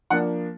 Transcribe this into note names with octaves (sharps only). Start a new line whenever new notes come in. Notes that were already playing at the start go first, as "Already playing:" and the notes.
F3 A#3 D4 F#5